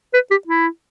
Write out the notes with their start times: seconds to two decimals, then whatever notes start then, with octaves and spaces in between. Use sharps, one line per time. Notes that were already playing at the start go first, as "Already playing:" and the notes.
0.14 B4
0.31 G4
0.47 E4